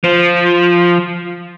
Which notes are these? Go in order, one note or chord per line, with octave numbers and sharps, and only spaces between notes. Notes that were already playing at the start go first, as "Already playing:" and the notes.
F3